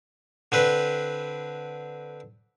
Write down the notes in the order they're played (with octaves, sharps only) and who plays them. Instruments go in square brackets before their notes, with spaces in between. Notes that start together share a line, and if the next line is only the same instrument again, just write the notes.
[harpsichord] D3 C4 B4